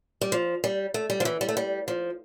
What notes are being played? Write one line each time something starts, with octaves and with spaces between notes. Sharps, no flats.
G3
F3
G3
A3
G3
F3
E3
G3
A3
G3
F3